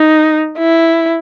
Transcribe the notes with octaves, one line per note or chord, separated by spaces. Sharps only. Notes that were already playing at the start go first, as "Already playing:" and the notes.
Already playing: D#4
E4